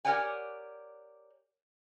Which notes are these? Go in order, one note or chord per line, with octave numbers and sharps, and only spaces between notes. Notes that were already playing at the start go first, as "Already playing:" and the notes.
G4 A#4 C#5 D5 F#5 G#5